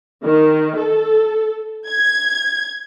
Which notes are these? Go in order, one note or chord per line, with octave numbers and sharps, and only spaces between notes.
D#3
A4
G#6